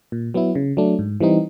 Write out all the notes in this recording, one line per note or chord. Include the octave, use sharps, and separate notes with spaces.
A#2
F#3 B3 E4
C#3
F#3 A3 D4
G#2
E3 G3 C4 D#4